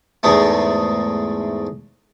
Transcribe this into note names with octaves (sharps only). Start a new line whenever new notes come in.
E2 G#2 G#3 A3